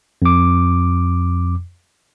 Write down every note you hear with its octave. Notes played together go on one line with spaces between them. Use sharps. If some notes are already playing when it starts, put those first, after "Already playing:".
F2 D6